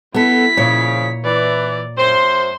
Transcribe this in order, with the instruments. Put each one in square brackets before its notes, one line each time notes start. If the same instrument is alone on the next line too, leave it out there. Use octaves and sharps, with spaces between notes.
[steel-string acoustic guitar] B3 A4 [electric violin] E4 B6
[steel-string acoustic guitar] A#2 C#5 [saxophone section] C#3 F3
[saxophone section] E3 [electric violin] D5
[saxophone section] F#2 C5 [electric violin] C6